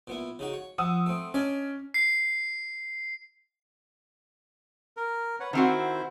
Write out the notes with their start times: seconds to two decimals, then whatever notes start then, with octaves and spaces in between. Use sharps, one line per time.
0.07 A#2 B3 E4
0.39 C#3 D#4 F#4
0.53 C#5
0.78 F3 F#5 D#6 E6
1.06 A3 C4
1.34 C#4 D4 D5 D#5
1.94 C7
4.97 A#4
5.40 B4 C#5 F#5
5.53 D#3 C4 E4 F#4 C5